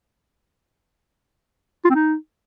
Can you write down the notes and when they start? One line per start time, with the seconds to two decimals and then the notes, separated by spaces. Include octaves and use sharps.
1.85 F4
1.90 C4
1.95 D#4